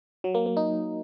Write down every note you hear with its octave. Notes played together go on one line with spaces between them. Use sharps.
F#3
A#3
A#3
D#4